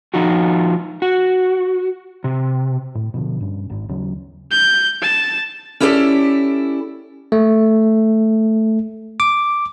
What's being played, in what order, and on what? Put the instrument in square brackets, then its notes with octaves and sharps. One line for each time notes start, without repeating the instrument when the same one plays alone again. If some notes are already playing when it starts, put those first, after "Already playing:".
[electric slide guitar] F3 D#4 F4 F#4
F#4
C3
[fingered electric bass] A2
B2 D3 F3
G2 C#4
G#1
D#2 C#3 F#3 C#4
[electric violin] G6
A5
[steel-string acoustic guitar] C#4 E4 G4 A4 C5 D5
[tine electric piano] A3
D6